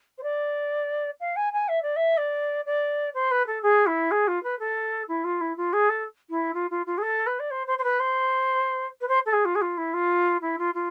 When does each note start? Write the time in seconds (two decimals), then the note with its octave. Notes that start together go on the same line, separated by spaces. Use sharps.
0.18 C5
0.23 D5
1.20 F5
1.36 G#5
1.52 G#5
1.68 E5
1.82 D5
1.96 E5
2.17 D5
2.66 D5
3.14 C5
3.31 B4
3.46 A4
3.62 G#4
3.86 E4
4.11 G#4
4.27 F4
4.43 B4
4.59 A4
5.08 E4
5.24 F4
5.40 E4
5.57 F4
5.73 G#4
5.89 A4
6.29 E4
6.54 F4
6.70 F4
6.86 F4
6.97 G#4
7.02 A4
7.26 B4
7.39 D5
7.50 C5
7.67 C5
7.78 C5
7.83 B4
7.99 C5
9.00 B4
9.08 C5
9.25 A4
9.32 G#4
9.45 F4
9.55 G#4
9.61 F4
9.77 E4
9.93 F4
10.41 E4
10.58 F4
10.74 F4